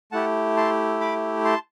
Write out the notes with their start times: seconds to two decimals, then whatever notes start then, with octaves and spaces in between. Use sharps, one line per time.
0.12 A3 E4 G4 F#5 A5
0.57 A5 C6
1.00 B5 D6
1.45 A5 C6